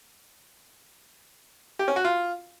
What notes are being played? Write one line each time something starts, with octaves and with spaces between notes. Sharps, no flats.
G4
C#4
F#4
F4